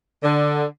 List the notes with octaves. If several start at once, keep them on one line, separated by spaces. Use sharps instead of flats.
D3